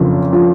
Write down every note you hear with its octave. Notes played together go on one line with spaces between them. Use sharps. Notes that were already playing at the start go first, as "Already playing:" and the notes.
Already playing: F#1 F2 F3
F3